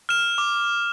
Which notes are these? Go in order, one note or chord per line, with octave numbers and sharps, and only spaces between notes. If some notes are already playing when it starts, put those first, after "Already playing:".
F6 E7
D6